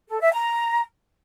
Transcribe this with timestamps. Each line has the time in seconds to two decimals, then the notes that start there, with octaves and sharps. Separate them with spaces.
0.09 A4
0.21 E5
0.32 A#5